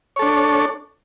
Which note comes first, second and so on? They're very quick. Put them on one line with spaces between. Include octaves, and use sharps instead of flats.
C#5 A4 D4